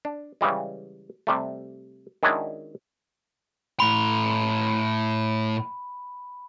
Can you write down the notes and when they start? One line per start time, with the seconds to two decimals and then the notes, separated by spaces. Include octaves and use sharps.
0.05 D4
0.41 C#3 E3 G3 G#3
1.27 C3 G3 A3
2.23 D#3 G#3 C#4 D4 E4 F#4
3.80 A2 B5 C6